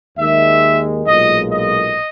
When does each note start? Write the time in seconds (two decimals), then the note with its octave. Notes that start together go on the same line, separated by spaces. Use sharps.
0.17 D#2 D#3 G#3 E5
1.07 B1 A#2 G#3 D#5
1.52 D#5